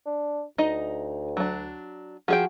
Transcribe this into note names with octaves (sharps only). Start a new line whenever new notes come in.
D4
D2 D#4 D#5
F#3 D4
F3 F#4 G#4 G5